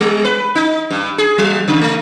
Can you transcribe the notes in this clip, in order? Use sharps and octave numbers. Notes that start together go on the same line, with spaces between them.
G3
B4
D#4
G2
G#4
F#3
C#3
A3